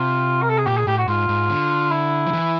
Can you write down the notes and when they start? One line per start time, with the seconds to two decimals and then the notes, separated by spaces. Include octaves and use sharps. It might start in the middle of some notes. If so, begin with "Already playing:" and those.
Already playing: C3 F4
0.42 A#4
0.49 A4
0.58 G#4
0.66 A#2 G4
0.77 G#4
0.87 A2 G4
0.98 F#4
1.08 G#2 F4
1.29 G#2
1.50 D3
1.91 E4
2.27 F3
2.33 E3